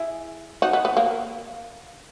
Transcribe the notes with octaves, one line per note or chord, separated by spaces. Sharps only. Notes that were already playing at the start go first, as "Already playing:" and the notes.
Already playing: E4 G#4
D#4 F#4
B3
B3
A#3